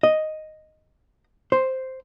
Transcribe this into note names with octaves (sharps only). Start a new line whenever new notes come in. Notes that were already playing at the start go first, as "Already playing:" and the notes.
D#5
C5